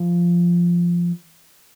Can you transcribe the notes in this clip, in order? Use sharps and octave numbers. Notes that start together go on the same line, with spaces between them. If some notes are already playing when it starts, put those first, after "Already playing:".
Already playing: F3